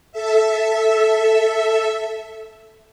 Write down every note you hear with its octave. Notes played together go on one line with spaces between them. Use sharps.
A4 E5